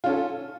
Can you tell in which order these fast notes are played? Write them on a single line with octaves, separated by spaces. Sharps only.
F4 C#4 A4